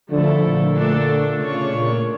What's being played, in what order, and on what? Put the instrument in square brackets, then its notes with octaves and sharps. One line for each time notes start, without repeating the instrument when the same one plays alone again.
[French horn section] D3 F3 [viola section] A3 E4 A4
[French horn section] A#2 D3
[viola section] A3 D4 A4
[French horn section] C#3 [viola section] A3 D4 F4 C#5
[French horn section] A#2